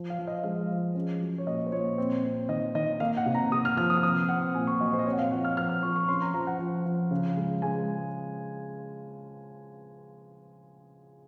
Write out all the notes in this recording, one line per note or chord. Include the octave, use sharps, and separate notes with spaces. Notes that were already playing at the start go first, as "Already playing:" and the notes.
Already playing: F3
F5
F3
D#5
G#3 F5
F3
C#4
F#3
C#5
A#2 D#5
C5
A#2 C#5
C4
C4
D#3 D#5
D#3 D#5
A#3 F5
F#5
C3
A#5
C3 D#6
F6
F3 F6
D#6
F6
C4 D#6
C4 F#5
A#2 G#5
C#6
F#3 D#5
C5
D#5
C4 C#5
F#5
F5
F3 F#5
F6
F3 F6
F6
F3 C#6
C#6
C#4 C6
A#5
F3 A#5
F#5
F3
F3
C#3
G#3
G#3 G#5